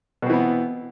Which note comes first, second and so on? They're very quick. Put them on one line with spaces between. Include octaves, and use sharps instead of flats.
B2 C4 E3 B3